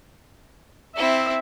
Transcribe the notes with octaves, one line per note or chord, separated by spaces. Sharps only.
C4 E4 E5